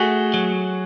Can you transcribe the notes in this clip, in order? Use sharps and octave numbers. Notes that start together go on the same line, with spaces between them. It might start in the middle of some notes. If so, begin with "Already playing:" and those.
Already playing: A3 F#4 G#4
F#3